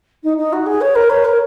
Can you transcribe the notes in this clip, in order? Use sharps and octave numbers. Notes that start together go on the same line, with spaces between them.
D#4
D#4
F#4
G#4
C#5
A#4
C#5
A#4